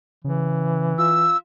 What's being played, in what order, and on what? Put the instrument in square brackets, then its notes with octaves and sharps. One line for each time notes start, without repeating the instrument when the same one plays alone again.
[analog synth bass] C#3 [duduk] E3
[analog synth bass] F4 [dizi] E6